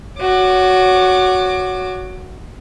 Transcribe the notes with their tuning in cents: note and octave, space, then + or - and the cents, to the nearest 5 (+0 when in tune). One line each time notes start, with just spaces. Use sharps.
F#4 +0 C#5 +25 D6 +25